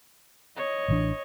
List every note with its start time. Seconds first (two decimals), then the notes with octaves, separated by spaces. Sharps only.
0.57 C#5 D#5
0.88 A1 E3 D4